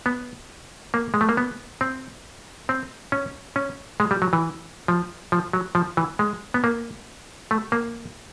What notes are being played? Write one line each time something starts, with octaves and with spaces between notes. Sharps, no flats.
B3
A#3
G#3
A3
A#3
B3
C4
C4
C#4
C#4
G#3
G3
F#3
E3
F3
F3
F#3
F3
E3
G#3
B3
A#3
A3
A#3